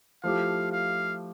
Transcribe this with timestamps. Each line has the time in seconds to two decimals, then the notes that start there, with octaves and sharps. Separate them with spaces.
0.24 F3 A3 E4 G4 F5
0.72 F5